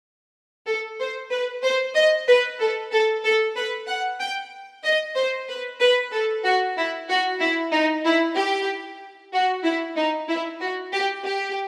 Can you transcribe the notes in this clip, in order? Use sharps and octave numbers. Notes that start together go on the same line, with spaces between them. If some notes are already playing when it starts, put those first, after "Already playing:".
A4
C5
B4
C5
D#5
B4
A4
A4
A4
B4
F#5
G5
D#5
C5
B4
B4
A4
F#4
E4
F#4
E4
D#4
E4
G4
F#4
E4
D#4
E4
F#4
G4
G4